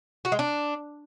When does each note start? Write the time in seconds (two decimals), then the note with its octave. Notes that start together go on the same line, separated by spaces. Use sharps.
0.25 F#4
0.32 G#3
0.39 D4